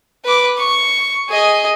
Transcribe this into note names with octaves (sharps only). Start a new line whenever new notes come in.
B4 D6
C#6
G#4 D#5